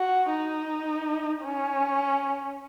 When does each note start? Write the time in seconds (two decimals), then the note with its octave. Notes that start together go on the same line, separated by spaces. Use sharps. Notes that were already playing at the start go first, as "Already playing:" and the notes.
Already playing: F#4
0.31 D#4
1.43 C#4